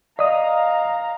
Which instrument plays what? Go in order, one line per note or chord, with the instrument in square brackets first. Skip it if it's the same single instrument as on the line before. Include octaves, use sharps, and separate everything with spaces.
[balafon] D5 [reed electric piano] D#5 D#6 [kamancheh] F5 A#5